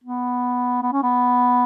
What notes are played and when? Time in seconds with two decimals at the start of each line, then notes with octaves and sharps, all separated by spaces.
0.04 B3
0.82 B3
0.92 C#4
1.03 B3